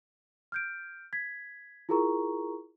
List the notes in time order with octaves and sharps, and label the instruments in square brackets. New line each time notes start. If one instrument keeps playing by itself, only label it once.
[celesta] F6 G6 D7
G#6 B6
E4 F4 G#4 A#4 A#5 C#6